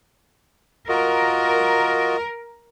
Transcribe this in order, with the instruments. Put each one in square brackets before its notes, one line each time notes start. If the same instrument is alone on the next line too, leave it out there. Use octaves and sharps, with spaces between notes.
[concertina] F4 F#4 D#5 [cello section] A#4